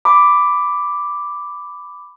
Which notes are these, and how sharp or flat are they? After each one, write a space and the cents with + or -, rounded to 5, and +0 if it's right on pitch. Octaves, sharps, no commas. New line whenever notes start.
B5 +10 D6 +0